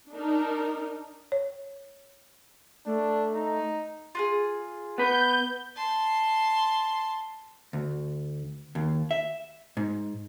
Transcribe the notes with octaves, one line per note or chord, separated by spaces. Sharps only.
D4 D#4 A#4
C#5
A3 D4
D#4
F4 F#4 G#4
B3 B4 G6
A5 C6
D2
D#2
E5
G#2